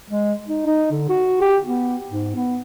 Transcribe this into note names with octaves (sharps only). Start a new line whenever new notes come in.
G#3
D#4
D#4
D3
F#4
G4
B3
G#2
B3